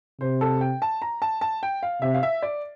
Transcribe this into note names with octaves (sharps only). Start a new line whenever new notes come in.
C3 C5
A4
G5
A5
A#5
A5
A5
G5
F5
C3 E5
F5
E5
D5